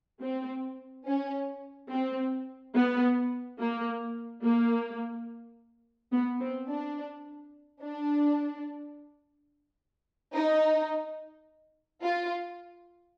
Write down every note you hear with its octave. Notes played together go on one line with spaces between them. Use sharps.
C4
C#4
C4
B3
A#3
A#3
B3
C4
D4
D4
D#4
F4